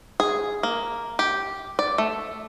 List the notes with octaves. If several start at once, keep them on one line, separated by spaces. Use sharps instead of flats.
G#4
A#3
G4
D5
A3